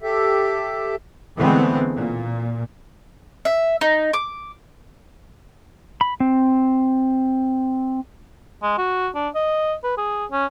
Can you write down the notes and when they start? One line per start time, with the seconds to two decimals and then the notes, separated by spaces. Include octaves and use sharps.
0.02 G4 A4 E5
1.37 D3 E3 G#3 A3 B3 C4
1.97 A#2
3.45 E5
3.81 D#4
4.13 D6
6.01 B5
6.20 C4
8.63 G#3
8.78 F#4
9.15 D4
9.35 D#5
9.83 B4
9.98 G#4
10.31 C#4